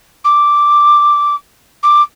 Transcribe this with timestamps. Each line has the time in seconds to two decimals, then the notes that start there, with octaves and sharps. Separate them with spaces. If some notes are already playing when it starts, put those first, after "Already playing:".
0.24 D6
1.82 D6